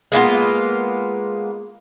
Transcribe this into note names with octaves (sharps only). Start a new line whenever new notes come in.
G#3 A#3 B3 F4